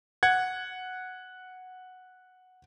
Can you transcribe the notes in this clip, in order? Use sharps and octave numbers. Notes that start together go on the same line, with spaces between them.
F#5 G#6